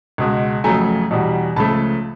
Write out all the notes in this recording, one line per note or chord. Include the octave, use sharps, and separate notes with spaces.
C#2 B2 G#3
F2 C#3 F#3 A3 G#5 A#5
E2 B2 G3
C#2 C#3 F3 A3 A5 B5